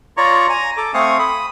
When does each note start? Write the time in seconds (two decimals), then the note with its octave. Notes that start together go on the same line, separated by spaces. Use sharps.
0.17 F4 C#5 D5 A#5 C#6
0.49 G#5 A#5
0.77 A4 D6
0.94 A3 C4 F5 G#5 C#6 D#6
1.19 B5 D#6